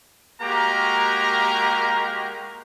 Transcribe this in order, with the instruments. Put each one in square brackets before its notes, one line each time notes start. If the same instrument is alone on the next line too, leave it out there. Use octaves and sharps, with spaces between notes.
[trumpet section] G#3 A#3 F#4 G4 A#4 A#5